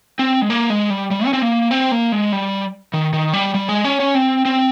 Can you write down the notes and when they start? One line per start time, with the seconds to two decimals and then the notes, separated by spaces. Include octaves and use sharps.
0.19 C4
0.42 G#3
0.50 A#3
0.70 G#3
0.90 G3
1.11 G3
1.26 C#4
1.33 C4
1.42 A#3
1.71 C4
1.91 A#3
2.12 G#3
2.32 G3
2.94 D#3
3.13 D#3
3.34 G3
3.54 G3
3.69 G#3
3.85 C#4
4.00 C#4
4.15 C4
4.45 C4